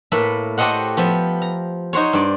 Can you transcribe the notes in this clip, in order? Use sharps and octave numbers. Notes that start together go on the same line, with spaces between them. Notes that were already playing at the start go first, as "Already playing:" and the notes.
A2 A#3 A4 B4 E5
F#4 G4 A4 C5 D#5 F#5
F3 B3 E5
A#5
D#4 F#4 C5 C#5
G2 D5